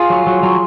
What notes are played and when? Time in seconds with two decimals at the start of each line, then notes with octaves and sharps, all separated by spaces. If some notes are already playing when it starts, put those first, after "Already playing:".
Already playing: F4 G#4
0.10 F#3
0.27 F#3
0.43 F#3